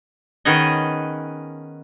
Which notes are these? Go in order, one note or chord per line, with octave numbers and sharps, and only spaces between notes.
D#3 B3 C#4 D#4 G#4 D#5